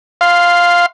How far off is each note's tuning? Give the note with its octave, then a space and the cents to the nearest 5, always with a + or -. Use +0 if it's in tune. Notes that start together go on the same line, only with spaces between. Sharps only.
F5 +0 C6 -10